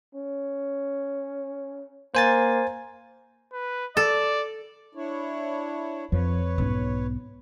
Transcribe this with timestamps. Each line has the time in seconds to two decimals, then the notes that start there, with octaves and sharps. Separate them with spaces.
0.15 C#4
2.15 A#3 C5 G#5 A6
3.53 B4
3.97 A4 D5
4.95 D4 E4 C#5
6.12 F2 F3 B4 C#5
6.58 B1 G#2 B3 C#4